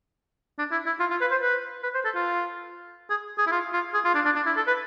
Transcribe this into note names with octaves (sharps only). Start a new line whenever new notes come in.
D4
E4
E4
F4
F4
B4
C5
B4
B4
C5
A4
F4
G#4
G#4
E4
F4
F4
G#4
F4
D4
D4
D4
E4
A4
B4